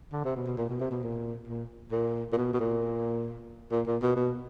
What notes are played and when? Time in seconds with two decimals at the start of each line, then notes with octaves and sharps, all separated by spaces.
0.12 D3
0.25 C3
0.36 B2
0.46 B2
0.57 A#2
0.69 B2
0.80 C3
0.91 B2
1.03 A#2
1.48 A#2
1.92 A#2
2.32 A#2
2.37 B2
2.53 B2
2.60 A#2
3.71 A#2
3.87 A#2
4.02 B2
4.16 B2